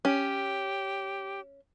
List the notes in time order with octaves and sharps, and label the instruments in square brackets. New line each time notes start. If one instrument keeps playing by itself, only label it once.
[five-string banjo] C#4 [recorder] G4